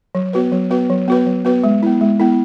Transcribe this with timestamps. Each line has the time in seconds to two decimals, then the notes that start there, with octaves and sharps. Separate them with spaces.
0.15 F#3
0.33 B3 F#4 B4
0.52 F#3
0.70 B3 F#4 B4
0.90 F#3
1.08 B3 F#4 B4
1.26 F#3
1.45 B3 F#4 B4
1.64 G#3
1.83 B3 E4
2.01 G#3
2.20 B3 E4